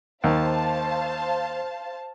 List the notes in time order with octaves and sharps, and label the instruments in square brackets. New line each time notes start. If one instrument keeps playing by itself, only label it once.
[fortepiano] D#2 [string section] C5 F5 A5